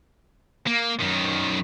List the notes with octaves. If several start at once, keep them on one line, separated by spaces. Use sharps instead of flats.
A#3
F#2 D#3